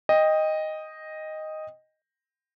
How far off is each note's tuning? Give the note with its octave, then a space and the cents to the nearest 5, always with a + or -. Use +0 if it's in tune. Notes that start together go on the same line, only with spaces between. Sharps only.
D#5 +0 G5 +20